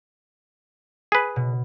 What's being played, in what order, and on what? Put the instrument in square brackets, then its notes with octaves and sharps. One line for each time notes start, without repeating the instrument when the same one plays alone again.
[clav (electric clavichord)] G#4 B4
[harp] B2